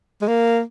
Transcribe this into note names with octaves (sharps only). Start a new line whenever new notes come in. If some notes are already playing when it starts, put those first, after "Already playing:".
G#3
A#3